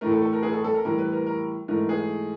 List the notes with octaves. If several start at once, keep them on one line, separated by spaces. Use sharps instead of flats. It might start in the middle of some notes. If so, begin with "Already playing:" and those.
A2 E3 A3 A#4
A4
A4
A#4
G#4
A4
A4
A#4
A2 E3 G3 A#4
B4
A#4
A#4
G#2 E3 A3 A#4
G#4